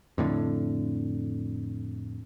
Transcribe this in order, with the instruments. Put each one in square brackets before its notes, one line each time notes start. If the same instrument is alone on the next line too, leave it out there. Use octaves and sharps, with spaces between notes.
[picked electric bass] F2 A2 D3